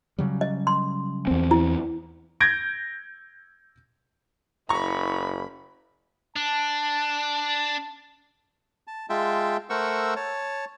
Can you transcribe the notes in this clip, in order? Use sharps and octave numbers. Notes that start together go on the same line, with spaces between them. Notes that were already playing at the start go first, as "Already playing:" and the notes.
C#3 F#3 G3
D#5
C6
E2 C4
E4
G6 G#6 A#6 D7
F#1 E4 A#5 B5 C#6
D4 A5
A5
G#3 F4 E5 G5 A5
A3 A#4 C5 F#5 C#6 E6
C#5 A5